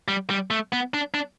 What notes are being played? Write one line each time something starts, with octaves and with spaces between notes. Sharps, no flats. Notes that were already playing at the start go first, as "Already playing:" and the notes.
G3
G3
A3
B3
D4
D4